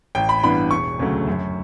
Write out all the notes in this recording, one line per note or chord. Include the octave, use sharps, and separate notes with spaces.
A1 G5
B5
G2 E3 B3 D4 B5
E1 C#6
D2 C#3 F#3 A3
F#2